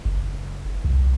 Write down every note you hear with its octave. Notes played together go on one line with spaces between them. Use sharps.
F#1
C2